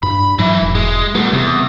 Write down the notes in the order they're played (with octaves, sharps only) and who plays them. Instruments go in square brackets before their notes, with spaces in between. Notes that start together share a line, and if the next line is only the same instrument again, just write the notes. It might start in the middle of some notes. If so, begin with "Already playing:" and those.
[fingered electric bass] G2 [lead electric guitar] B5
[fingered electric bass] G#2 F#3 [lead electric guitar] E3 E4
[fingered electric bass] E1
[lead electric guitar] G#3
[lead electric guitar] A#2 B3 [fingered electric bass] G3 A3
[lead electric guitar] E2 [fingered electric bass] C3